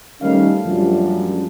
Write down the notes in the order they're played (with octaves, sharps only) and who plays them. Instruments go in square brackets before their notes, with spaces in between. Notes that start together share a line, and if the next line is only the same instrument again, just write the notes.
[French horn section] D#3 G3 C#4 [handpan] A3 F5
[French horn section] F#2 [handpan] F3 G3 D4